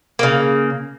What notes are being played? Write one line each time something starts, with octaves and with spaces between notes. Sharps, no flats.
C#3 A#3